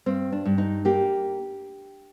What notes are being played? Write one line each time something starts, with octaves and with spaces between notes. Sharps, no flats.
G2 C4
D4
G2
D#4
A#3 G4